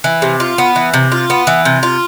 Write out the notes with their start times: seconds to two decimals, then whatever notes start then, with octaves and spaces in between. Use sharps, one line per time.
0.04 E3
0.22 C3
0.40 F4
0.58 B3
0.76 E3
0.94 C3
1.12 F4
1.30 B3
1.47 E3
1.65 C3
1.83 F4